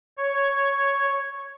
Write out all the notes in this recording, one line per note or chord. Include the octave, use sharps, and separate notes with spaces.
C#5